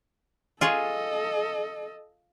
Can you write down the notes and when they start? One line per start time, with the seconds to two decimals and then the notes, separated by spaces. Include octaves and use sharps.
0.61 F4 G#4 A4 C#5 D#5